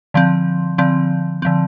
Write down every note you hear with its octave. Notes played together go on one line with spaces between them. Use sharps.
D3 F3 C4
D3 F3 C4
D3 F3 C4